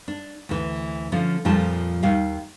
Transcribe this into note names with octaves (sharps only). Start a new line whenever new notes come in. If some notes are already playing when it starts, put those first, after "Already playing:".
D4
D2 E3
D3 F3 C#4
F2 A#2 F3 G3 A5
D#2 D#3 G3 F5